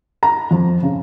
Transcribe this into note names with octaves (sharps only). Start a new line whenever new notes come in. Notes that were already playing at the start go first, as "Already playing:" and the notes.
A#5
F2
C#3